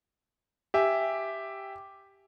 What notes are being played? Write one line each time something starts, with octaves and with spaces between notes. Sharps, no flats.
G4 E5 G#5